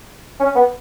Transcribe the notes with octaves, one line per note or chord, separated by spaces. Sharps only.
C#4
B3